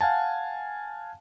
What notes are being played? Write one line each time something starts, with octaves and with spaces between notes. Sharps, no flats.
F5 F#5 G#5 A5